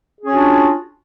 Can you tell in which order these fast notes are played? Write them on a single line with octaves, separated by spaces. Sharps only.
G#4 C#4 F#4 D4 F4